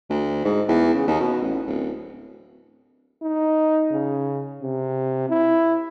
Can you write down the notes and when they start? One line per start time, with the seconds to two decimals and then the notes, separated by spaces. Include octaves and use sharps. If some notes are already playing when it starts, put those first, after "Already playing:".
0.10 D2
0.44 G#2
0.68 E2
0.94 C#3
1.07 D#2
1.20 B2
1.42 A1
1.67 D1
3.22 D#4
3.91 C#3
4.62 C3
5.30 E4